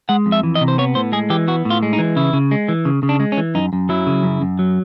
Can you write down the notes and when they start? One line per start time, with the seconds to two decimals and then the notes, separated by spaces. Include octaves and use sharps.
0.09 G#3 F#5
0.26 F2
0.32 E5
0.43 E3
0.55 D#5
0.61 C3
0.68 C5
0.78 B3 C#5
0.95 A2 C5
1.12 G#3 G#4
1.30 E3 G4
1.48 B3 F#4
1.65 A2
1.70 F4
1.83 G#3
1.93 D#4
1.99 E3
2.16 C#3 E4
2.33 C#3
2.51 G#3
2.69 E3
2.85 C#3
3.03 C#3
3.09 D4
3.20 G#3
3.32 C#4
3.38 E3
3.55 F#2 D#4
3.73 F#2
3.89 F#3 E4
4.07 C#3
4.23 F#2
4.42 F#2
4.59 F#3